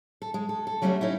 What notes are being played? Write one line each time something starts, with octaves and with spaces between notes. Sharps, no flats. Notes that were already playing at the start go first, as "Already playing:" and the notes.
A4
G#3
A4
A4
F#3 G3 A3 C#4 F4 F#4
C#4 D#4 E4